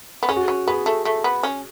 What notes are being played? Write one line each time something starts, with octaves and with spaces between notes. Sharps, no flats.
B3
C#4 G#4
F#4
C#4 G#4
B3 G#4
A3
A3
B3
C#4